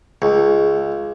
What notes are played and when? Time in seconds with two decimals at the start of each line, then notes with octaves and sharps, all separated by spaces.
0.22 C#2